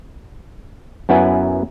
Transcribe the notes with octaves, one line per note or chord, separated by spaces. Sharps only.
F#2 B3 E4 B4 G#5